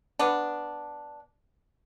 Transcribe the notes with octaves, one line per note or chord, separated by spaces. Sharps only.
B3 D4